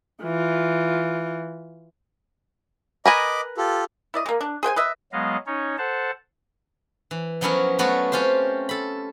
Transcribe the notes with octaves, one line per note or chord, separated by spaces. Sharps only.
E3 F4
A#4 B4 D#5 G#5 B5 D6
F4 G4 A4
E4 D5 D#5
G#3 A#3
D4
G#4 C5 G5 G#5
B4 D#5 E5
F#3 G#3 B3 D#5 F5
C#4 D#4 C#5
A4 C5 F#5 A5
E3
F3 F#3 B3 C#4 E4 A#4
F#3 A3 B3 F4 F#4
C4 C#4 F4 G4 C5
A4 B5